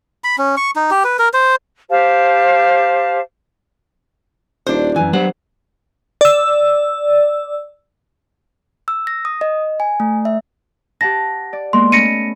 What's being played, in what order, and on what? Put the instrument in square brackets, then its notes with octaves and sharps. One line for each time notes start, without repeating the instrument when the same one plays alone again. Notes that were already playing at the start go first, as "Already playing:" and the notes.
[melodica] B5
C#4
C#6
D#4
G4
B4
A#4
C5
[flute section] G4 C5 F5 A5
[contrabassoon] D#1 [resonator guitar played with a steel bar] D4 C5
[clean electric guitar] F#2 E3 [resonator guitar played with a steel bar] G#5
[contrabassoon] G2 [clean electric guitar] F#3 C5 F#5 [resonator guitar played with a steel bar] B3
[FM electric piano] D5 E6
[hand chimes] E6
A#6
D#6
D#5
G#5
A3
E5
[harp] G4 F#5 A5 [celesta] A#6
[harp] D5
[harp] G#3 A#3 B3 [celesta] C6
[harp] A3 C#4 B5 [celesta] A#6 C#7 D#7